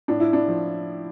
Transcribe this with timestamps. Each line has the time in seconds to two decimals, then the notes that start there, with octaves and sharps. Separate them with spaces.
0.08 A2 D4
0.20 E4
0.33 D4
0.48 F3